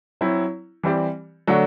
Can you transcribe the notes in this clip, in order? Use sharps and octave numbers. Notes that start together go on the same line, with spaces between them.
F#3 C4 E4
E3 G3 C4 G4 D5
D3 F#3 A3 D4 F#4